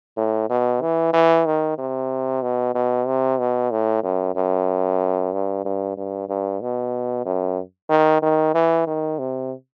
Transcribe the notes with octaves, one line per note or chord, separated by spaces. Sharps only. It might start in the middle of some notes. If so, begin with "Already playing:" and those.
A2
B2
E3
E3
D#3
C3
B2
B2
C3
B2
A2
F#2
F#2
G2
G2
G2
G2
B2
F#2
D#3
D#3
E3
D#3
C3